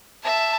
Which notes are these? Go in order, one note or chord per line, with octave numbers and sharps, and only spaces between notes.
E5 A5